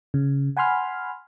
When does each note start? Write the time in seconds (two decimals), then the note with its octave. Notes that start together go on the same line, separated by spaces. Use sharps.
0.14 C#3
0.57 F#5 G#5 B5 C6 F6